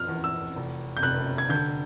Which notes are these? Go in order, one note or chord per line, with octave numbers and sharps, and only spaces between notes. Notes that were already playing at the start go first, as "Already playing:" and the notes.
Already playing: F3 F6
E2
E6
F1
G6
F1 F#6
G#6
D3 G6